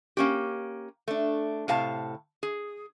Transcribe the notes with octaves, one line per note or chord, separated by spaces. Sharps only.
A#3 C#4 G4
A3 D4
A2 C3 F5 A5
G#4